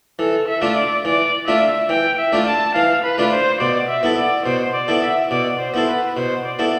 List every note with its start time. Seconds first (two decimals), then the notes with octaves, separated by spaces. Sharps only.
0.19 E3 A4
0.48 E5
0.62 A3 D4 F4
0.76 D5
1.05 E3 D5
1.47 A3 D4 F4 E5
1.89 E3 G5
2.19 E5
2.32 A3 D4 F4
2.47 A5
2.75 E3 F5
3.03 B4
3.18 A3 D4 F4
3.32 C5
3.60 B2 D5
3.88 E5
4.03 B3 E4 A4
4.17 D5
4.45 B2 C5
4.73 D5
4.88 B3 E4 A4
5.03 E5
5.30 B2 D5
5.59 C5
5.74 B3 E4 A4
5.88 B4
6.16 B2 C5
6.45 D5
6.59 B3 E4 A4